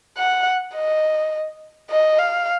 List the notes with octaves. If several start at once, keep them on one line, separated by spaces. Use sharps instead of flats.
F#5
D#5
D#5
F5